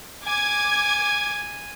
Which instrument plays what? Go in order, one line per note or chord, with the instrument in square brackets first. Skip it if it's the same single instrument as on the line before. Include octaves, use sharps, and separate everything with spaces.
[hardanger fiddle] G#5 [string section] D6 G#6